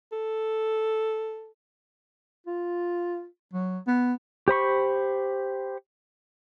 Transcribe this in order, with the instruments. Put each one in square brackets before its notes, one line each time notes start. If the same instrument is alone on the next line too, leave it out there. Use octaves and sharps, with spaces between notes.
[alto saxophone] A4
[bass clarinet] F4
F#3
B3
[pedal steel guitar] G4 C5 B5 C#6